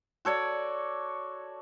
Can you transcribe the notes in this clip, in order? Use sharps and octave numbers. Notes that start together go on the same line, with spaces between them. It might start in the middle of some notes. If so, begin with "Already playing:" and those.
F#4 A4 C#5 D5